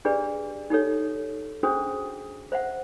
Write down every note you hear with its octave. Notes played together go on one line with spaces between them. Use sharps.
D4 G4 G#4 B4 D5
D#4 G4 A4 C#5
C#4 D4 F#4 G#4 C5 D#6
C5 E5 F#5